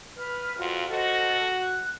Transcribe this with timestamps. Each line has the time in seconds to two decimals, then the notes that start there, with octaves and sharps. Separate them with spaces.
0.16 B4 F6
0.58 F2 F4 F#4
0.89 F#4 A4 C5 D#5
1.57 F#6